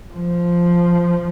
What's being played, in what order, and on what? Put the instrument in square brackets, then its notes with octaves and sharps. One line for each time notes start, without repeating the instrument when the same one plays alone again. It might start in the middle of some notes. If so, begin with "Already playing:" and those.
[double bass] F3